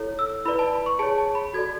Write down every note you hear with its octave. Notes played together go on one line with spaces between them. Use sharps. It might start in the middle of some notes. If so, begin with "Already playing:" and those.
Already playing: E4 A4 C#5
E6
E4 B4 D5 B5
A5
B5
C#6
G#4 C#5 A5
A5
B5
F#4 A4 D5 G#6